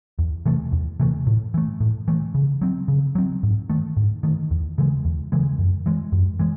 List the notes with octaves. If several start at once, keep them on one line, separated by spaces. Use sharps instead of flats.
E2
C3 E3 A3
E2
C3 E3 A3
A2
E3 A3
A2
E3 A3
C#3
F#3 C4
C#3
F#3 C4
G#2
D#3 A3
G#2
D#3 A3
E2
C#3 E3 G#3
E2
C#3 E3 G#3
F#2
E3 G#3
F#2
E3 G#3